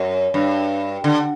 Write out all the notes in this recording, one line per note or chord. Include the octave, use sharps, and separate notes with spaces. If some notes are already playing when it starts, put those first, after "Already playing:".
Already playing: F#2
G2
D3